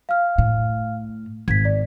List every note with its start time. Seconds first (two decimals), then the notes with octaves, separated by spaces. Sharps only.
0.09 F5 F6
0.38 A2
1.48 G#1 G#6 B6
1.65 D5